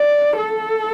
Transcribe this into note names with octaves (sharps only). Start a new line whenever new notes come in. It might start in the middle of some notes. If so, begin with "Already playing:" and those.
Already playing: D5
A4